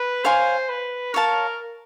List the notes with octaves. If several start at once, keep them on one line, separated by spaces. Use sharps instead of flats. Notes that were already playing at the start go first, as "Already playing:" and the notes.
Already playing: B4
C5 C#5 F5 G#5 C6
B4
A#4 C#5 F5 A5